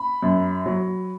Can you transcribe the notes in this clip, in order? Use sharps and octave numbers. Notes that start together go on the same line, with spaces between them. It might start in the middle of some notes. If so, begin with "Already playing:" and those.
Already playing: B5
F#2
F#3